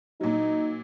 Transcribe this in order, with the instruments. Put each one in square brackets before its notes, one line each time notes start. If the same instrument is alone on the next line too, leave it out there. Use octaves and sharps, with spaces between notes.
[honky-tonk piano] A#2 F#3 [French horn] D#4